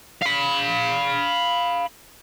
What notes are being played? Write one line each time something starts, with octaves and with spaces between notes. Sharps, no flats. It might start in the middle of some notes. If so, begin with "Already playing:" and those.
F5 B5